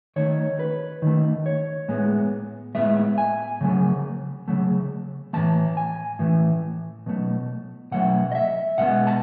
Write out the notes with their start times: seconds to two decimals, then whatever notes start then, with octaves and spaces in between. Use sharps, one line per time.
0.16 D#3 A3 C#5
0.59 B4
1.02 D#3 A3
1.46 C#5
1.88 A2 G#3 B3
2.75 A2 G#3 B3 E5
3.18 G#5
3.61 C#3 F#3 A3
4.48 C#3 F#3 A3
5.33 A2 E3 A3 A5
5.77 G#5
6.19 A2 E3 A3
7.06 B2 F#3 A3
7.92 B2 F#3 A3 F#5
8.32 D#5
8.35 E5
8.78 B2 G#3 B3 F#5
9.07 A5